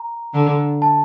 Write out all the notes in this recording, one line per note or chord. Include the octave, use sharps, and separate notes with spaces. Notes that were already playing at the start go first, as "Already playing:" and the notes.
Already playing: A#5
D3
A5